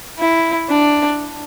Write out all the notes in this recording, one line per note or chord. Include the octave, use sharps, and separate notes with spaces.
E4
D4